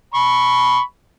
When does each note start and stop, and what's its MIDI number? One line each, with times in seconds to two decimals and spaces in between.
0.14 0.80 83
0.14 0.80 85